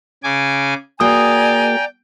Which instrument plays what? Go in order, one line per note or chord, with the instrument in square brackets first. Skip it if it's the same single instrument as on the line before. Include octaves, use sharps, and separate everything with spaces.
[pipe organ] C#3 G#5 D6
[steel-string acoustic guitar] A#3 F#4 G#4 [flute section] D5 G#5 A#5 [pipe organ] G5 [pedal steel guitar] D#6